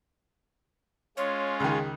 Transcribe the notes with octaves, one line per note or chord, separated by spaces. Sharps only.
G#3 C#4 F4 C#5
C#2 D#3 G#4